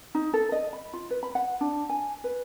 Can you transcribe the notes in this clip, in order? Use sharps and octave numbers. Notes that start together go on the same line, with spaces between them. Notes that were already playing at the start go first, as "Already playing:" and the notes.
D#4
A4
D#5
B5
F4
B4
B5
F#5
D4
G#5
B4